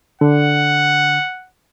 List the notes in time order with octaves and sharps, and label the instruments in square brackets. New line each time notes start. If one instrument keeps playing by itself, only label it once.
[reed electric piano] D3 [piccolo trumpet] F#5